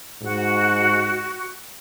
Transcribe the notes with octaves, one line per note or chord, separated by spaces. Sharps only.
G#2 F#4